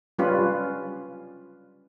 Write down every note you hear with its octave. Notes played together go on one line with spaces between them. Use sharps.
G3 C#4 F4 B4